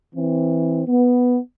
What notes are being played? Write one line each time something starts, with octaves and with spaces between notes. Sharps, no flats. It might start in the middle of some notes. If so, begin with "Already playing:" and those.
E3 C4
B3